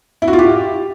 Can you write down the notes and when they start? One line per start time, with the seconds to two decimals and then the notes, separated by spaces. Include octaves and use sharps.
0.22 E4
0.28 F#4
0.33 F4
0.39 G4